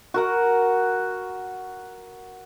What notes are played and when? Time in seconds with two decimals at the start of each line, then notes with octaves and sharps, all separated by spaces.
0.14 F#4 A#4 F#5